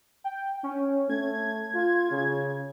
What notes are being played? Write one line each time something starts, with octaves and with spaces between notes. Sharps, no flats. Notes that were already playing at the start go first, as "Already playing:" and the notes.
G5
C#4
A3 G#6
F4
C#3